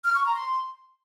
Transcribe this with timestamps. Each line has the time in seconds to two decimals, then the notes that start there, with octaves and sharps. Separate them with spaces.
0.05 F6
0.15 C#6
0.25 A#5
0.34 C6